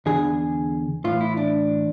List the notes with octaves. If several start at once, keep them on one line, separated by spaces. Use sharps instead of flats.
E2 D3 G#4
A2 E3 F4
E4
D4